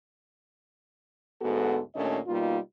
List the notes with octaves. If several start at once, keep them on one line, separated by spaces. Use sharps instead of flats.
D2 G#2 B3 F#4 A4
D#2 A#2 A3 C#4 D4 D#5
B2 G3 A#3 D#4 F4